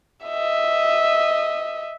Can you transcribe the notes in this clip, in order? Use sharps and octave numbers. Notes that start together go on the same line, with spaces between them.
D#5 E5